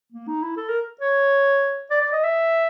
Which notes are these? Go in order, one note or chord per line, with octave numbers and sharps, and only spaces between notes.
A#3
D#4
E4
A4
A#4
C#5
D5
D5
D#5
E5